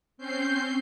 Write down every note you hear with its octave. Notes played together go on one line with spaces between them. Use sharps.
C4 C#4 G6 C7